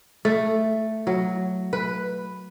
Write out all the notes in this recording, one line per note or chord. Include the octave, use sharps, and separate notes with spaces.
A3
F#3
B4